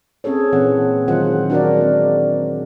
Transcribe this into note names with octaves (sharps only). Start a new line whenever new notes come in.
C4 C#4 G#4 A4 C#5
A#2 E3 C4 C#4 F#5
D#3 F#3 G#3 F4 C5 F#5
D4 F#4 A#4 D5
G#3 C4